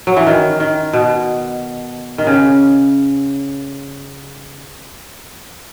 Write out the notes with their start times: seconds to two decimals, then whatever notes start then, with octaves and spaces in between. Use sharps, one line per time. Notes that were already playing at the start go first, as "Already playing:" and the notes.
0.07 F#3
0.16 E3
0.27 D#3
0.60 D#3
0.93 B2
2.18 D#3
2.27 C#3